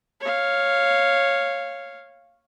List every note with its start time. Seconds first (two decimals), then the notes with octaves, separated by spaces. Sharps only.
0.21 C#5 F5